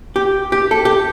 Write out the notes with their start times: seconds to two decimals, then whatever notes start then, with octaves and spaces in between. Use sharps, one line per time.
0.16 G4
0.52 G4
0.71 A4
0.85 G4